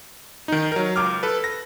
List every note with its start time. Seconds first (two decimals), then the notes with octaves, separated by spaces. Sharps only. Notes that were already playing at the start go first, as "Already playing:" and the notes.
0.48 D#3 D#4
0.72 F#3 A#4
0.96 C#2 D6 F6
1.23 A4 B4
1.44 A#6